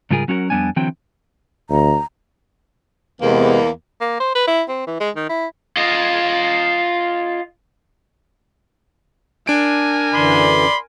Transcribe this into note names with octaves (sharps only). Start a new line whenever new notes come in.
G#2 C#3 G3 F4 G#4 A#4
F#3 C#4 F#4 G#4 A#4
F2 G3 B3 D4 G#5
D3 E3 F#3 C4 G5
D2 A#5
E2 C3 G#3 A#3 B3
A#3
C5
B4
E4
C4
E3
G#3
D#3
E4
F4 D#5
D4 A#4 G#5 D7
F#2 D3 E3 D5 B5 C6